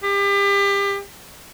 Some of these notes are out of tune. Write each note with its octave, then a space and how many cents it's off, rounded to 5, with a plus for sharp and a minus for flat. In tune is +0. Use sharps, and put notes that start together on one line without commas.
G4 +30